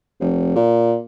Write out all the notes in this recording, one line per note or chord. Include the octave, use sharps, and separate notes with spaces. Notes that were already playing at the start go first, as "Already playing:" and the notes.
F1
A#2